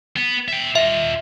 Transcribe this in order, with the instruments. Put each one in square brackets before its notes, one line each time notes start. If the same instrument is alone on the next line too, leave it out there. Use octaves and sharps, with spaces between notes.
[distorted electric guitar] B3
E5 G5
[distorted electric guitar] F4 D#5 [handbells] E5